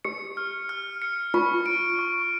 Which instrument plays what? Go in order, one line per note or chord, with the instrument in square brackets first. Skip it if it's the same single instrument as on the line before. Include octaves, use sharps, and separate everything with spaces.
[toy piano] G4 [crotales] C#7
[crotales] F6
F6
C#7
[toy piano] F4 [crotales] C#6
[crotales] D7
C#6